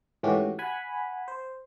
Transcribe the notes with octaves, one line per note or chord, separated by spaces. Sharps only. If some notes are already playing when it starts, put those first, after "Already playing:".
G#2 E3 A3 C#4 F#4 G4
F#5 G#5 B5
C5